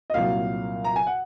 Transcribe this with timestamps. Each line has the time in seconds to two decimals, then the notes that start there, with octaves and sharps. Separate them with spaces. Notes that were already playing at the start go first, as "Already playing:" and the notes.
0.10 D#5
0.14 C2 A#2 F#3 F5
0.84 A#5
0.96 G#5
1.07 F#5